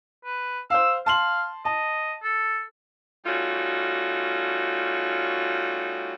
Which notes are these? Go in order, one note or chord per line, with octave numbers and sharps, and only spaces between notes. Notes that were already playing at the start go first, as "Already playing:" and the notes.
B4
C5 F5 E6
F5 A5 C6 F#7
D#5 A5
A4
G3 A3 C#4 D#4 F4 F#4